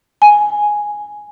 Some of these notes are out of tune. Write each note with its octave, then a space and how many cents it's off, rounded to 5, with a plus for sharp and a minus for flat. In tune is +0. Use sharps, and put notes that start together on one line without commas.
G#5 +0